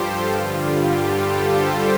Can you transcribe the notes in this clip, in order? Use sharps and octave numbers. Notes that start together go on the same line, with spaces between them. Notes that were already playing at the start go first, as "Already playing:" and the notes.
Already playing: G2 F3 F4 G4 A4 C5
G2 D3 G3 F4
G4
F4 A4
G4 C5